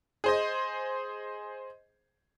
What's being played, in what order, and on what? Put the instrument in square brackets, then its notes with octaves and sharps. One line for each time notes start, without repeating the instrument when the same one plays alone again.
[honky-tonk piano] G#4 C5 D#5